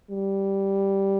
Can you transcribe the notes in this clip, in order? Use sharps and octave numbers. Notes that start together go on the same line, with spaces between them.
G3